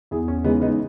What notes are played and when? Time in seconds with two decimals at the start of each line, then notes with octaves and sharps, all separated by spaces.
0.11 E2 E4 G#4
0.28 C#4
0.44 C#3 E3 G#3 B3 D#4
0.61 B3 D#4